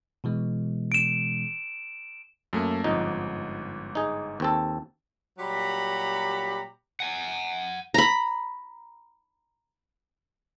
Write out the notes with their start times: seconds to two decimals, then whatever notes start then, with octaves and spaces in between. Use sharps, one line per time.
0.24 B2 E3 G#3
0.92 D7 E7
2.53 F#2 A3 A#3
2.84 G1 F2 G#2 D#4
3.95 D#4 G#4
4.40 D#2 C4 A4
5.39 A#2 F#3 G3 G4 A#5 B5
7.00 F#5 G#5
7.94 A#5 B5